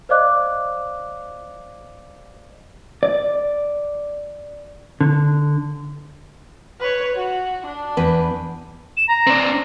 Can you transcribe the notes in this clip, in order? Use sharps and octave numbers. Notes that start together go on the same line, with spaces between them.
C5 D5 D#5 F5 D6 F#6
D5
D3
B4 C#5
F#4
D4
E2 B4
E7
A#5
C4 D4